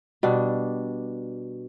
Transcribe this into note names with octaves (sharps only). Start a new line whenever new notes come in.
B2 G3 D4